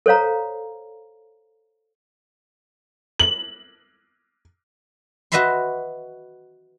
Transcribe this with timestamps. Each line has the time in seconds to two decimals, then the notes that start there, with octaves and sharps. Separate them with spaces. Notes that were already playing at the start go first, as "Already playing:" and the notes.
0.06 A4 C5 C#5 F5 A#5
3.20 F#7
5.32 F#4 B4 D#5 E5 B5 C6